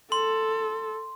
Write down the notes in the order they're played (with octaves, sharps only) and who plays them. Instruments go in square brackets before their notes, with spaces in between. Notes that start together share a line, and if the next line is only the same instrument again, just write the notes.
[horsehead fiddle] A4 [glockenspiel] C6